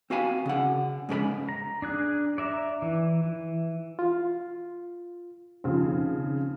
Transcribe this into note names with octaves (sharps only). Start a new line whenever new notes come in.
C4 F#4 F5 G#5 B5
C#3 F#5
G#2 C#3 A#4 B5
A#5
D4 G#4 F#6
D5 E5 A#5
E3
E3
F4
D#2 C#3 F3 C4